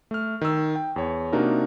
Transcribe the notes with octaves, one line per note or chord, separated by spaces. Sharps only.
A3 F6
D#3 E6
G5
E2 C#5
C3 A#3 D4 D#4 F#4 A#4